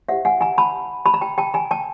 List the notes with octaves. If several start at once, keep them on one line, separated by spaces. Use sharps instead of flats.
E4 G4 C5 E5 F#5
F#5 G#5
G#5 A#5
A5 B5
A5 B5
A#5
G5 A5
G5 A5
G#5 A#5
G5 A5